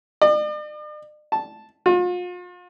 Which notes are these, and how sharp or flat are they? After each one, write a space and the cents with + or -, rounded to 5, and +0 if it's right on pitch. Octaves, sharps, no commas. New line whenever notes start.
D5 +45
A5 -5
F4 +40